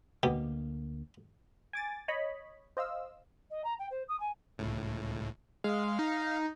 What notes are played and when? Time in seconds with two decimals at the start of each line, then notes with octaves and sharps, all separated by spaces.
0.23 D2 B2 D3 A#3 G4
1.73 G#5 D6 A6
2.08 C#5 D#5 B5
2.77 C5 D#5 F5 E6
3.50 D#5
3.64 A#5
3.79 G5
3.90 C5
4.08 D#6
4.19 G#5
4.58 C#2 A2
5.64 G#3 F5
5.99 D#4